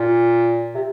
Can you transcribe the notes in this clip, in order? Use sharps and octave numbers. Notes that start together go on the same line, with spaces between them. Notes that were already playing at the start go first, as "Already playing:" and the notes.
Already playing: A#2
C3